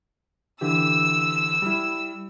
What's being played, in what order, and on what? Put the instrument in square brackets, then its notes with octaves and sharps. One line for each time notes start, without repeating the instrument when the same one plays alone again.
[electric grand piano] D3 E3 G4 [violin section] E6
[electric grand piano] G3 E4